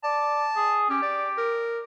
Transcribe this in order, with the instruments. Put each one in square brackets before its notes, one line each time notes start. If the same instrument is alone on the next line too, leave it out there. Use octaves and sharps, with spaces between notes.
[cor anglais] D5 [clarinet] A5
[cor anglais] G#4
[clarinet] C#4 [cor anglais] G4
[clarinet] D5
A#4